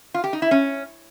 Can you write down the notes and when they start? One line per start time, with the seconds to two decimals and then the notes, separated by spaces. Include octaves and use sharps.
0.14 F4
0.24 G4
0.33 D#4
0.42 E4
0.51 C#4